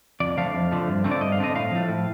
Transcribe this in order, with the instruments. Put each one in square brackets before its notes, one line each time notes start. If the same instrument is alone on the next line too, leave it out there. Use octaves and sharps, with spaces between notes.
[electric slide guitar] F2 D5
D3 F3 A3 F5
F2
D3 F3 A3
G2
D3 A3 C4
D5
G2 D#5
F5
D3 A3 C4 D#5
A2 F5
F3 A3
A2